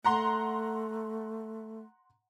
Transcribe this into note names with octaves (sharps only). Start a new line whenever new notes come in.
A3 F#5 A#5 C6